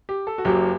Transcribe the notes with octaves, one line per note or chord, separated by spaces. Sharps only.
G4
A4
F#4
F#1 F#2 F#3 G4